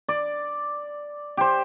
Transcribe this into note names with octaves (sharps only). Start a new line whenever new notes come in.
D5
G4 C5